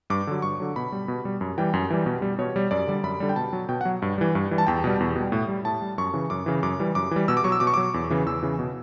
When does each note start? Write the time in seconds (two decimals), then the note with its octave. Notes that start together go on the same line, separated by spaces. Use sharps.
0.10 G2 D6
0.27 D3 F#3
0.42 G2 C#6
0.60 D3 F#3
0.76 B2 B5
0.92 G3
1.08 B2
1.25 G3
1.41 F#2
1.58 E3 G3 G5
1.74 F#2
1.90 E3 G3
2.06 B2
2.22 G3
2.39 B2 C#5
2.56 G3
2.71 F#2 D5
2.87 D3 G3
3.03 F#2 B5
3.20 D3 G3
3.29 G5
3.36 B2 A5
3.53 F#3
3.69 B2 G5
3.81 F#5
3.85 F#3
4.02 G2
4.18 E3 G3
4.35 G2
4.51 E3 G3
4.58 A5
4.67 E2 G5
4.84 B2 G3
5.00 E2
5.16 B2 G3
5.32 A2
5.48 G3
5.65 A2 A5
5.82 G3
5.98 F#2 C#6
6.13 C#3 E3
6.30 F#2 D6
6.46 C#3 E3
6.63 F#2 D6
6.79 E3 G3
6.95 F#2 D6
7.11 E3 G3
7.28 B2 E6
7.37 D6
7.44 F#3 C#6
7.52 E6
7.60 B2 D6
7.67 C#6
7.74 F#3 D6
7.94 E2
8.10 C#3 E3
8.26 E2 E6
8.43 C#3 E3
8.59 B2